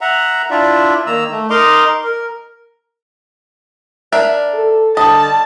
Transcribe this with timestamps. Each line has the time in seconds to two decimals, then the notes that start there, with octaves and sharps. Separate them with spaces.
0.01 E5 F#5 A#5
0.51 D4 E4 F4 D5 E5
1.07 D#3 A#3 A#5 E6
1.31 A3
1.50 D#4 A#4 D#5 A#5 C6 D6
2.04 A#4
4.13 D4 A#4 D5 E5
4.54 A4
4.97 D3 G3 D#5 A5